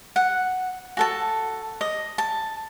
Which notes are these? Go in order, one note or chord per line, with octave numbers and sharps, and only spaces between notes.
F#5
F#4 A4 A5
D#5
A5